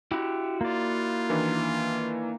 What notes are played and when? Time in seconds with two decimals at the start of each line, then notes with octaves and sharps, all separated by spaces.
0.12 E4 F#4 G4
0.61 A#3 F4 D5
1.29 D#3 E3 D4